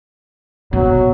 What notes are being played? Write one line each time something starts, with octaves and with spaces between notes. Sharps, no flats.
B2 F#3